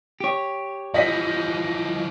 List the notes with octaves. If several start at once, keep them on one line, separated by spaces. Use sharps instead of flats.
G4 C#5
E3 F3 D#5 B6